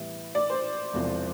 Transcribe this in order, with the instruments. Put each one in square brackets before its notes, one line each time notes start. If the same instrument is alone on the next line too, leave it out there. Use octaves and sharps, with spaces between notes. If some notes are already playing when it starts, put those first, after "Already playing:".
Already playing: [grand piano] A2 E3 G3 B3 E4
[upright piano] D5
C5
[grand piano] E1 E2 C3 F3